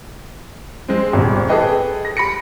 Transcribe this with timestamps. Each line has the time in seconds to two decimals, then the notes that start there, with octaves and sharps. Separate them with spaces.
0.88 G#3 C4
1.13 D#1 G#1
1.48 G#4 A4 B4 D#5 G5 A5
2.05 A#6
2.17 B5 A#6 C#7